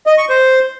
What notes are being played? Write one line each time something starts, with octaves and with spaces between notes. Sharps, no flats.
D#5
C#6
C5